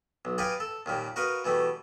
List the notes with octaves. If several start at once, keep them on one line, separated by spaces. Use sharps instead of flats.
B1
G4 B4 D5 D#5 F5 G#5
A4
D#2 A#2 G3
F#4 A#4 B4 D#5 F5
B2 E3 G3 A3